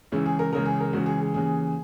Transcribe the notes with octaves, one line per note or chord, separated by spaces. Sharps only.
C#2 C#3 E3 E4
G#4
A#4
C#2 C#3 E3 A#4
G#4
A#4
C#2 C#3 E3 F#4
G#4
G#4
D#2 C#3 E3 G#4